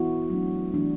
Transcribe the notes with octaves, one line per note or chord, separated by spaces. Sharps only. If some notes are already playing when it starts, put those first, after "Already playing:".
Already playing: E3 B3 E4 F#4
F#3 A3 D4
E3 A3 D4